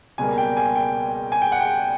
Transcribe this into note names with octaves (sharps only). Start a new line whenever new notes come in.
C#2 B2 G3 A#3 G#5
G5
G#5
G5
G#5
G5
F#5
G5